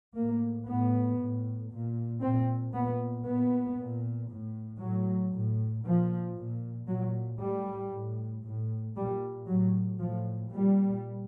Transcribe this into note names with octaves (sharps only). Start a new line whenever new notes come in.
A2 A#3
A2 B3
A2
A#2
A#2 C4
A#2 B3
A#2 B3
A#2
A2
A2 F#3
A2
A#2 F3
A#2
A#2 F#3
A2 G3
A2
A2
A#2 G3
A2 F#3
A2 F3
A#2 G3